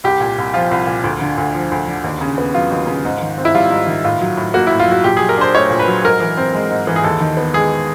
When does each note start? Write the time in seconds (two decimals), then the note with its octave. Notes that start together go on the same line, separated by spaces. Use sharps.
0.04 C2 G4
0.21 A#2
0.38 C2
0.54 F3 F4
0.71 C2
0.87 A#2
1.04 D2
1.21 D3
1.38 D2
1.54 F3
1.72 D2
1.88 D3
2.04 D#2
2.21 C#3
2.38 B3
2.54 F#3 F4
2.71 D#2
2.87 C#3
3.05 G#2
3.22 D#3
3.38 C4
3.45 E4
3.55 G3 F4
3.71 G#2
3.87 D#3
4.04 A2 F4
4.21 F#3
4.37 A2
4.54 A#3 F#4
4.67 E4
4.71 A2
4.80 F4
4.87 F#3 F#4
5.04 A#2 G4
5.17 G#4
5.21 F#3
5.29 A#4
5.37 D4 C5
5.55 A3 C#5
5.70 A#2
5.79 B4
5.87 F#3
6.04 G#2 A#4
6.20 E3
6.37 C4
6.54 G#3
6.70 G#2
6.87 E3
6.96 G#4
7.04 D#2 A4
7.21 D#3
7.37 B3
7.54 G#3 G#4